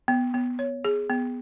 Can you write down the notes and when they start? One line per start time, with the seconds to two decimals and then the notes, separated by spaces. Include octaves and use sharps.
0.08 B3
0.34 B3
0.59 C#5
0.85 G#4
1.10 B3